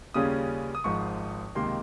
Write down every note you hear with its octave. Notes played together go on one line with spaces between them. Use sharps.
D#2 C#3 G3 C#4 F4 D#6
D#6
G#1 G#2 F3 C#6
C#2 C3 D#3 A#3 C6